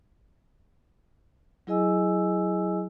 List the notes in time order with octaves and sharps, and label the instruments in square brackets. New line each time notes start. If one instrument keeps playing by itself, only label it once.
[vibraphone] F#3 E4 G#4 D#5 G#5 E6